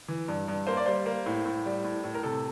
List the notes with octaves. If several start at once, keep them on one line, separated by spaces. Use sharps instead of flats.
E3
G2
G2
A#3 C5
D5
G3 C5
A#3
A2
A2
G3
A2
A2
A#4
C3 A4